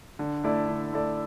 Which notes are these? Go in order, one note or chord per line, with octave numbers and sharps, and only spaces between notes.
D3
A3 E4 A4 D5
D3
A3 E4 A4 D5